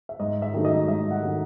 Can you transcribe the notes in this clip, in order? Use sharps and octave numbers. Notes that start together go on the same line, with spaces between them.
E5
G#2 D#5
E5
D#3 F#3 A3 D#4
D#5
G#2 E5
F#5
D#3 F#3 A3 D#4